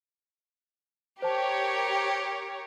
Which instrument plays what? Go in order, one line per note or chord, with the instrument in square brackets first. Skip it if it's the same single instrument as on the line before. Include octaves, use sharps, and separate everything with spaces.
[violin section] G4 A#4 C#5 [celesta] C5 A5